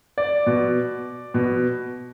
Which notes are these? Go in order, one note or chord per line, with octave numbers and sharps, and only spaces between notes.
D5
B2
B2